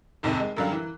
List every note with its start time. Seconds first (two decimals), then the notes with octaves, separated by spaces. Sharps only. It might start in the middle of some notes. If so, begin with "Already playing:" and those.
0.23 F1 D#2 G#2 C3
0.40 G#3
0.56 F#2 D3 F#3 G3 F5 F#6
0.72 E3